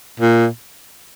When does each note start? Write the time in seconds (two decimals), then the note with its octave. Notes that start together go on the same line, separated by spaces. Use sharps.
0.20 A#2